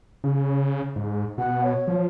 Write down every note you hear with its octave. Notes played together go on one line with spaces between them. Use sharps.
C#3
G#2
B2 F#5
C#5
F3